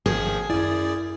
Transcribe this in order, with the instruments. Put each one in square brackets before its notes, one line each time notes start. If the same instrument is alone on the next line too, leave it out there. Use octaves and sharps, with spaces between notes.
[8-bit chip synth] G#1 D#3 F3 [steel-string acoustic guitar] G#4
[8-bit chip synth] F#2 D5 [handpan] E4